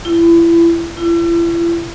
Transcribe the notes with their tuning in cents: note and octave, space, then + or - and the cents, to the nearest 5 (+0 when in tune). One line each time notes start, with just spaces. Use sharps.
E4 +30
E4 +40